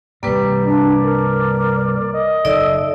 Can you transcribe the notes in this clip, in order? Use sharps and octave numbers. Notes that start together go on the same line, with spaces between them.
C2 G2 G3 A#3 B4
D4 D5
A#4
D#5
F#1 D#4 A4 D5 E5